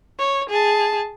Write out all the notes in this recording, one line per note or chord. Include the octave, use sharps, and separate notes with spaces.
C#5
G#4 A5